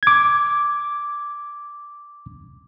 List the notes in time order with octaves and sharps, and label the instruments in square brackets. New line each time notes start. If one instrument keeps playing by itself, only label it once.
[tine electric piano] D6 G#6